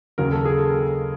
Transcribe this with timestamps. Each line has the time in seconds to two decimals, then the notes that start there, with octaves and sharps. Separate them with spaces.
0.18 D#2 C#3 F#3 A#4
0.32 A4
0.45 G#4
0.59 A4